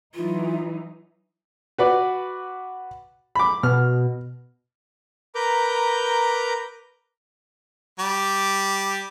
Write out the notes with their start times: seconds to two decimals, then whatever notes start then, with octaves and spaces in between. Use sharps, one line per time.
0.15 E3 F#3 D#4 F4
1.78 F#4 B4 D5
3.35 B5 D6
3.63 B2 F6
5.35 A#4 B4 A#5 D6 G6
7.99 G3 D6